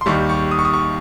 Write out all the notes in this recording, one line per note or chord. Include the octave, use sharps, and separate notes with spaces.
C6
D#2 D#3 G3 C#6
C#6
D#6
C#6
D#6
C#6